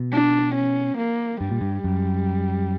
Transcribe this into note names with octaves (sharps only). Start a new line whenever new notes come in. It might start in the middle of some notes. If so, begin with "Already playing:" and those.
Already playing: B2
D4
C#4
A#3
G2 G3
A#2
G2
F#2